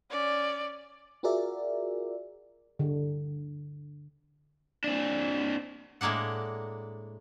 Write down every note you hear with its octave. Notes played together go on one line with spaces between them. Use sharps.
C#4 D5
F4 F#4 G#4 A#4 D5 E5
D3
C4 D4
A2 G#3 A#3 D4 F#5